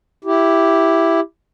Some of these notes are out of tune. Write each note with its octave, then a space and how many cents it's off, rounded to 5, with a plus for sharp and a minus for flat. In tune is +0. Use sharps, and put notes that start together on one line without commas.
E4 +5 G4 +0